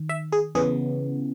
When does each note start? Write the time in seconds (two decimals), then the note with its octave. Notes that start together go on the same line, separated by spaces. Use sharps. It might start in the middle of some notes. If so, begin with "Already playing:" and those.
Already playing: D#3
0.09 E5
0.32 G#4
0.55 C#3 E3 B3 G#4